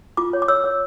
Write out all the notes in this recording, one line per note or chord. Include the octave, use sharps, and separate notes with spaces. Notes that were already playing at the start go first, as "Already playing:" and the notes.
F4 D6
C#5
D6
C#5 E6
C#5